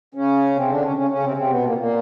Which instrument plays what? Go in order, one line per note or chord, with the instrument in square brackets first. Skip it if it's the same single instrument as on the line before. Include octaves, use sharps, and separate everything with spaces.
[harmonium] C#3 C#4
C3 C4
D3 D4
C#3 C#4
C#3 C#4
C#3 C#4
C3 C4
C3 C4
B2 B3
A#2 A#3
A#2 A#3